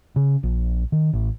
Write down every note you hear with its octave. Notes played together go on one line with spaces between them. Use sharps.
C#3
A#1
D#3
A1